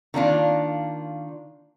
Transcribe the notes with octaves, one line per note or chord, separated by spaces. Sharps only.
D#3 A#3 D4 F4